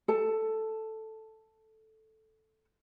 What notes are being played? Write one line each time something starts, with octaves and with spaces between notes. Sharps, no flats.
A4 A5